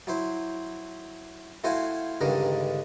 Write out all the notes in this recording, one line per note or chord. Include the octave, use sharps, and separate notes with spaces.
F#3 E4 C5
A3 E4 F#4 C5 F5 G#5
C#2 G2 D3 D#3 G3 A#4